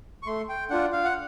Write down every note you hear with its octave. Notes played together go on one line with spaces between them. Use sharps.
C#6
A3 C6
G5
D4 F4 F#5
F5
F#5